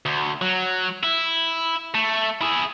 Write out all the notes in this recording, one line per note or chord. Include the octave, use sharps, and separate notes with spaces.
D2
F#3
E4
A3
E4 G#4